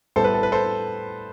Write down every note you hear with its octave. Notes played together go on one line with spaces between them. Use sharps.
A2 G3 B3 A4 C5
B4
A4
B4
A4 C5